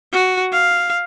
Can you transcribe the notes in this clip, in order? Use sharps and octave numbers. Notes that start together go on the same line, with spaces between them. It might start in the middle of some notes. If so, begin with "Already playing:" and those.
F#4
F5